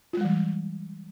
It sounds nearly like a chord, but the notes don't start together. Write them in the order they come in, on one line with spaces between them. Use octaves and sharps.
F4 G#3 G3 E3